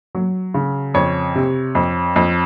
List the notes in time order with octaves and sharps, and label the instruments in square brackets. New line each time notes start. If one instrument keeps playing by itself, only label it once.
[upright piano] F#3
C#3
F2 C#5
C3
F2
F2